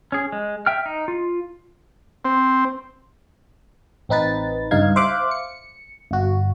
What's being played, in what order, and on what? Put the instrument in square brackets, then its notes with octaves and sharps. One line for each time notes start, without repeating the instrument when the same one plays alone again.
[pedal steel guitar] C#4 G#4
G#3
E5 G5 F6
D#4
F4
[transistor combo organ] C4
[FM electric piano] A1 C4 D#4 B4 A6
G1 C#2 G2 D#4 F5 G#6
C5 E5 F5 D6 F#6
C#7
G1 F#4